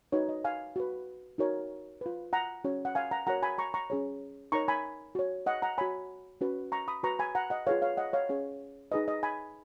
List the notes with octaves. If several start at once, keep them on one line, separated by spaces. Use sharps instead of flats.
D#4 F#4 B4 C#5
D#5
F5 G#5
F#4 B4
D#4 F#4 A#4 C#5
F4 B4
F#5 A#5
C#4 F#4 C#5
F#5
F5 G#5
F#5 A#5
F#4 A#4 C#5 F#5 A#5
G#5 B5
A#5 C#6
A#5 C#6
C#4 G#4 C#5
D#4 A#4 C#5 A#5 C#6
G#5 B5
F#4 C#5
D#5 F#5
F#5 A#5
F#4 C#5 G#5 B5
C#4 F#4 B4
A#5 C#6
B5 D#6
F#4 B4 A#5 C#6
G#5 B5
F#5 A#5
D#5 F#5
F4 G#4 B4 C#5 F5
C#5 F5
D#5 F#5
C#5 F5
C#4 G#4 C#5
D#4 G#4 B4 D#5
D#5
G#5 B5